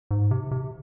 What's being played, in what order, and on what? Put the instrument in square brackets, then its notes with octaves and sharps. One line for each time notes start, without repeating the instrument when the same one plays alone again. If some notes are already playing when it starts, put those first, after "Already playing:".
[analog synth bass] G#2
C3
C3